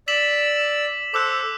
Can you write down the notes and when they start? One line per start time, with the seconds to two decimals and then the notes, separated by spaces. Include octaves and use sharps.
0.08 D5 E6 B6 E7 F#7
1.14 A4 C5 D6 E6 F#6